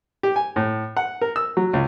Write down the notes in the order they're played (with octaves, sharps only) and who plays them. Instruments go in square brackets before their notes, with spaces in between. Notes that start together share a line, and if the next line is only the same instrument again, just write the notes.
[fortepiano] G4
G#5
A2
F#5
A#4
E6
F#3
C#2